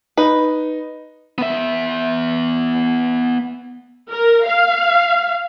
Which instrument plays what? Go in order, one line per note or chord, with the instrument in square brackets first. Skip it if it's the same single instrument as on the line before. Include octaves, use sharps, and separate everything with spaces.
[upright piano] D#4 [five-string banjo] B4
[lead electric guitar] B3 E5
[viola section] A#4
F5